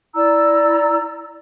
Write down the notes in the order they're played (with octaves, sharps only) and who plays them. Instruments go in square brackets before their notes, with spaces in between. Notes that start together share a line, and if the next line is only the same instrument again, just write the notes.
[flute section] E4 D5 A#5 E6